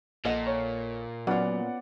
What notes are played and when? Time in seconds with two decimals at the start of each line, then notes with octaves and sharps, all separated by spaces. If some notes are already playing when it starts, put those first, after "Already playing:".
0.25 A#1 A#2 A4 D#5 F#5
0.47 C#5
1.27 F#3 B3 C#4 F4 D5 F#5